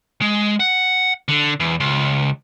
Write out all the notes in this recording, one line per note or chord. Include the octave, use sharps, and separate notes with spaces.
G#3
F#5
D3
E2
C#2